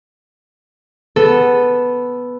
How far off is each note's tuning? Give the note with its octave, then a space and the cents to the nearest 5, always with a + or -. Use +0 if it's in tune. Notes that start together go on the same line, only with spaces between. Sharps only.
B3 +0 A4 +0